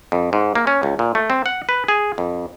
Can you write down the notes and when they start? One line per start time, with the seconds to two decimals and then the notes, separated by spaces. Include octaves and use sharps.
0.12 F2
0.33 G#2
0.55 A#3
0.67 C#4
0.83 C#2
0.99 A#2
1.15 A3
1.30 C4
1.46 F#5
1.69 B4
1.88 G#4
2.18 F2